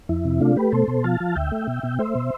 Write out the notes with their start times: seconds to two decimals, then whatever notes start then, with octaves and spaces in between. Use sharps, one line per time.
0.09 F2 E4
0.25 C3
0.40 A3 D4 F4
0.56 A3 G4 B4
0.72 B2 A4 C5
0.88 B2
1.04 F3 F5 A5
1.20 F3
1.36 D2 E5 G5
1.52 A3
1.67 B2
1.83 B2
1.99 A3 C5 E5
2.15 B2